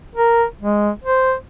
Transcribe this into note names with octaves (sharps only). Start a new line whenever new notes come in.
A#4
G#3
C5